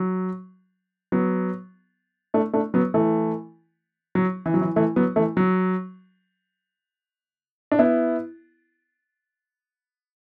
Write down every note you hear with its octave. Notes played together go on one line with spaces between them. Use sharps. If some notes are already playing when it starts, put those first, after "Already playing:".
Already playing: F#3
F#3 B3
A3 D4
A3 D4
F#3 B3
E3 A3
F#3
E3
F#3
E3
E3 A3
F#3 B3
E3 A3
F#3
D4
B3 E4